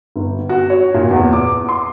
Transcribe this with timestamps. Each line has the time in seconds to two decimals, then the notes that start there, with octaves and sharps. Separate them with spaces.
0.16 G1
0.49 F#4
0.70 C#5
0.94 A#2
1.10 E2
1.33 D6
1.69 C6